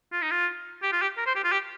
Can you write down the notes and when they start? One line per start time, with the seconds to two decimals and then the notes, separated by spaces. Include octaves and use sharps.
0.12 F4
0.22 D#4
0.31 F4
0.82 G4
0.92 F4
1.02 G4
1.17 A#4
1.26 C5
1.35 G4
1.44 F4
1.52 G4